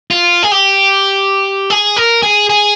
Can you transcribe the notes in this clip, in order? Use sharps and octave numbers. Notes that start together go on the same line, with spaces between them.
F4
G#4
G4
G#4
A#4
G#4
G#4